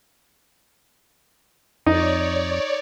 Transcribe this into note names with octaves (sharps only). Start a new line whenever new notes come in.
F2 D#4 C#5 D5